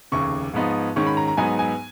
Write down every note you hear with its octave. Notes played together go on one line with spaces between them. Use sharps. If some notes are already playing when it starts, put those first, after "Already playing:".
F1 D#2 C#3 C#6
G#2 F3 B3 D#4
G#2 D#3 G#3 C#4 C#6
B5
A#5
A#5
G#2 F#3 B3 D#4 G#5
G#5